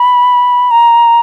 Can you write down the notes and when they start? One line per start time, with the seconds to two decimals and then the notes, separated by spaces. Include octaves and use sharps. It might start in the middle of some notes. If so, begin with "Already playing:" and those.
Already playing: B5
0.71 A#5